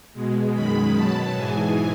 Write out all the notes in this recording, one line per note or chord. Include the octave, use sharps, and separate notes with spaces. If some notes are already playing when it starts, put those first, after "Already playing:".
B2 G#3
F#2 D#3 G#3 B5
B2 F#3 A5
G#2 E3 G#3 G#5